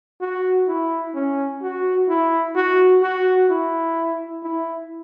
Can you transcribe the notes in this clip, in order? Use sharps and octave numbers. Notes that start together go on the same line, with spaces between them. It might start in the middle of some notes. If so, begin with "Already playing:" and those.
F#4
E4
C#4
F#4
E4
F#4
F#4
E4
E4